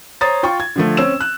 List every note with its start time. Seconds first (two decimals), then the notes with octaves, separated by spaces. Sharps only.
0.21 C5 C#5 A#5 D#6 A6
0.43 F4 G5 C#6
0.60 G#6
0.76 D3 F3 A3
0.97 C4 C#4 E6 E7
1.21 F#6